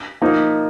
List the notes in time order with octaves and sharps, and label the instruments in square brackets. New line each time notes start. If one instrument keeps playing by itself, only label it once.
[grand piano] F3 A#3 D#4